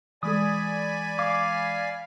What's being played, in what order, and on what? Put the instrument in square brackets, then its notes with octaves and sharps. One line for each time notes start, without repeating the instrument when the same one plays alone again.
[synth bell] E3 G#3 A4 [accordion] D5 G#5 B5 [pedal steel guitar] D#6
[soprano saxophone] F5 [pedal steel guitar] D6